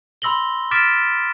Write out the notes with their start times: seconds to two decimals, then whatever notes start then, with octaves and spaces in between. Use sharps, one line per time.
0.22 B5 C6 E6 A#6 F#7 G7
0.71 D6 F6 A6 B6 D7 E7